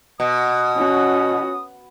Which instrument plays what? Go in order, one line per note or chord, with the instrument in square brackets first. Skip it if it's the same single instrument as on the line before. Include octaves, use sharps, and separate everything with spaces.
[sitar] B2 [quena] D#6
[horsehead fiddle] C#4 F#4